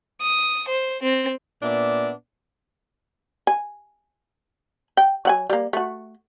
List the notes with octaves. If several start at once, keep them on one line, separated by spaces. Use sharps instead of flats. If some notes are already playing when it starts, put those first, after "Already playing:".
D#6
C5
C4
A#2 B3 D4 D5 E5
G#5
G5
F#3 F#5 G#5
G3 A#3
A3 F#4